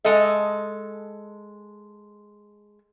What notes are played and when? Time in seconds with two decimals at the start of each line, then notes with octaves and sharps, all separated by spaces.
0.05 G#3 A4 D#5 E5